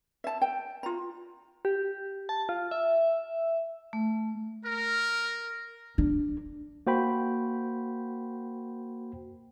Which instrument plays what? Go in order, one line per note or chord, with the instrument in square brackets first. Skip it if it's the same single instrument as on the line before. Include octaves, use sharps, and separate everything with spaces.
[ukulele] E5 A5
G5
F4 A#5
[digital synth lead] G4
A5
F4
E5
[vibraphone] A3
[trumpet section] A#4
[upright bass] D4
[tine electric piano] A#3 F#4 C5 G5 B5